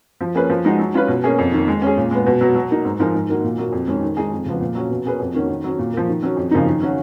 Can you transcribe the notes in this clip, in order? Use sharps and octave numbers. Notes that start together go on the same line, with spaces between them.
F3
A#3 C#4 G#4 B4
F3
G#3 D#4 F#4
F#3
C#4 F4 B4
B2
A#3 C#4 G#4
F2
D#3
A#3
G#3
C#4 G#4
A#2
G#3 B3
B2
F#3 B3
F#3
A#3 D#4
G#2
F3 G#3 D#4 A#4
G#2
D#3 A#3 D#4 F#4
A#2
F#3 A#3
F2
D#3 G#3 C#4
D#3
G#3 D#4 G#4
F2
C#3 F3 B3
A#2
F#3 C#4
B2
A#3 C#4 G#4 B4
F2
D#3 A#3 C#4 F#4
D#3
F#3 C#4
A#2
F3 A#3
D#3
F#3 C#4
F2
C#3 F3 A#3 D#4
D#3
F#3 C#4 F#4